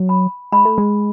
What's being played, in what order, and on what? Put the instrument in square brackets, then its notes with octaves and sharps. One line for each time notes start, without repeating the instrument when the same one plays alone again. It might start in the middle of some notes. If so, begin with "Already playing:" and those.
Already playing: [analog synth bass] F#3
[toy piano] B5
[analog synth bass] G#3 [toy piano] B5
[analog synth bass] A3
G#3